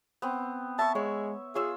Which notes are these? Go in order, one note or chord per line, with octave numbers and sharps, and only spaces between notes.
B3 C4
E5 A5 C#6
G#3 C#5
F4 G#4 C#5 E6